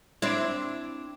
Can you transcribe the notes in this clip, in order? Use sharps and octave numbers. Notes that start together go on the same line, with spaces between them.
C4 D4 E4